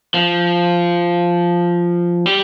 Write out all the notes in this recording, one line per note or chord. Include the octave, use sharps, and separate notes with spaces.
F3
G3